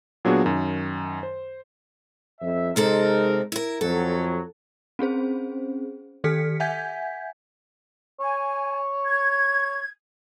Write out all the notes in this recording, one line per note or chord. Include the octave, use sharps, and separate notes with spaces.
A#2 F#3 B3 D4 F#4 G#4
F#2 D#3
C5
F2 E5
C3 G#3 C4 D#4 A4 A#4
E4 A#4
F2 F#3 A4
C4 C#4 G#4 C5
D#3 G4 A4 F6 B6 C#7
E5 F#5 G#5 G6 G#6 B6
C#5 G#5
G#6